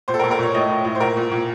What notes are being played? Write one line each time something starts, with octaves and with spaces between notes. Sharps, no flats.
A#2 C5
A4
A#4
A#2
A#4
A#2 C#5
A2 D#5
A2
A2
C5
A#2 A#4
A#2
A#2